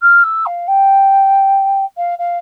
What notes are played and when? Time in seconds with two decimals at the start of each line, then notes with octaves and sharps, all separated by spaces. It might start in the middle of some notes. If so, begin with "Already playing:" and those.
0.02 F6
0.24 E6
0.46 F5
0.68 G5
1.97 F5
2.19 F5